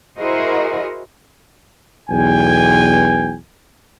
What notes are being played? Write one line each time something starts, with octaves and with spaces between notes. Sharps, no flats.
E4 F#4 G#4 A#4 C5 D#5
B1 E2 G5 G#5